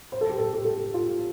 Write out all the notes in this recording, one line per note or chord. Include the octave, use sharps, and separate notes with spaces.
C5
A4
G4
A4
G4
A4
G4
F4